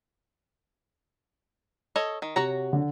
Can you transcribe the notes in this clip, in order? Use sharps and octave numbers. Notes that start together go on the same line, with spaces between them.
A4 C#5 D#5
D#3
C3 F#4 C#5 A#5
D3